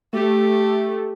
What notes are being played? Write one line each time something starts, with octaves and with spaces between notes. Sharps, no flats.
A3 G4